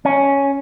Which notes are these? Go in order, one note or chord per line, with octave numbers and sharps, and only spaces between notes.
C#4